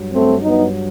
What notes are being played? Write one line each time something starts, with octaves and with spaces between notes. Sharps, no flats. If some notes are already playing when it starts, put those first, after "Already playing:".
Already playing: G2 F#3
A3 C4
B3 D#4